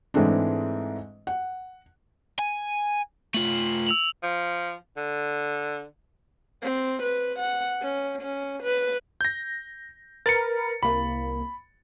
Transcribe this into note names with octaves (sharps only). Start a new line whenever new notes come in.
G#2 E3 G#3 A3 C4 D4
F#5
G#5
A3 F4 F#7
E6 F7 F#7
F3
D3
C4
B4
F#5
C#4
C#4
B4
G6 A#6
A#4 B4 A6 C#7
C2 A#3 B5